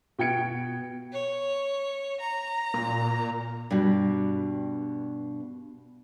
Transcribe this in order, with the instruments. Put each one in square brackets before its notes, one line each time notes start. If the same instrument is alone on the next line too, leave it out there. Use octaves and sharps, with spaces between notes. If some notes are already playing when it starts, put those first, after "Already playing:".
[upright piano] B2 G5 G#6 C#7 D7
[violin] C#5
A#5
[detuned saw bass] A#2
[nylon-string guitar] G2 B2